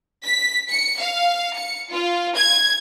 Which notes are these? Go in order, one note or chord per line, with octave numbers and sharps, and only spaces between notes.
B6
C#7
F5
C#7
F4
G#6